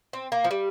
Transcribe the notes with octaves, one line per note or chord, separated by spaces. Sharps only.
C4
A#3
F3
G3